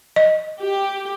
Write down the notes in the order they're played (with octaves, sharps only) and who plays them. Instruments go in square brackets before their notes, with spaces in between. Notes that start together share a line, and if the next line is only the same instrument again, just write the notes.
[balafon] D#5
[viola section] G4